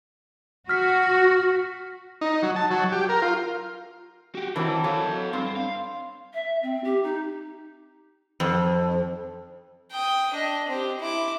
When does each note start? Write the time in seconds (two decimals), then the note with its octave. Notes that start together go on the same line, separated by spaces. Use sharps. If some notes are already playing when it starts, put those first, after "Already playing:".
0.69 F#4 F6 B6
2.21 D#4
2.43 F#3
2.56 A5
2.71 F#3
2.92 G4
3.09 A#4
3.22 F4
4.35 F#4 G4
4.56 D#3 E3 F#3 C4 A#4 A5 D6
4.84 F#3 A4 C#5 F5
5.33 G2 C4 C6 C7
5.56 F5
6.34 E5
6.62 C4
6.84 G4
7.03 D#4
8.40 F2
9.91 G5 D#6
10.34 D4 D#5
10.68 C4 G4
10.99 E4 D6